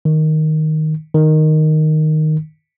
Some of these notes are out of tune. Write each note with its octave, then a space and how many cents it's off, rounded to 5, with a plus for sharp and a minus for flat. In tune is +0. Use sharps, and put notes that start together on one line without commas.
D#3 +0
D#3 -5